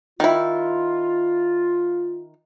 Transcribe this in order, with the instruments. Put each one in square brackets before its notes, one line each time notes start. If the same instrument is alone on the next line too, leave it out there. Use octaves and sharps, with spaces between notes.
[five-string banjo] D#3 E4 [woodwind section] F4